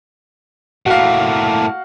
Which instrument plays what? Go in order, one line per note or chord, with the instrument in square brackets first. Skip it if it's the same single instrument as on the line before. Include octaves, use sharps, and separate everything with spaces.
[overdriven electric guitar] A2 A#3 [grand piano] F#4 F5